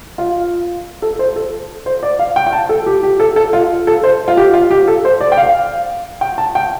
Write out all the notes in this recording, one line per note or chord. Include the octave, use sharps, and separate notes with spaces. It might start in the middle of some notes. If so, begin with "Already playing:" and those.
F4
A4
C5
A4
C5
D5
F5
G5
G5
A5
A4
G4
G4
A4
A4
F4
A4
C5
F4
G4
F4
G4
A4
C5
D5
G5
F5
G5
A5
G5